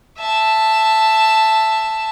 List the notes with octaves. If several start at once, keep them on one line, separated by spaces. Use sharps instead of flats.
E5 A5